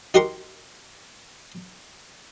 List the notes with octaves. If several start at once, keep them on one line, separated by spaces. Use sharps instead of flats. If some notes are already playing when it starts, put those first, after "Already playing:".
D#4 F#4 G4 A#4 C6 C#6